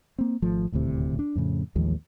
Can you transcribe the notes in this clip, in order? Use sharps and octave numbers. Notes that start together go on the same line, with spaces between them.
A#3 C4
G#1 F3 A3
D#1 D2 A2 C3
D4
F2 A2 C#3
A1 D#2 F3 G#3